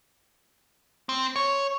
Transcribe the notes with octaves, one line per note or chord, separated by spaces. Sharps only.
C4
C#5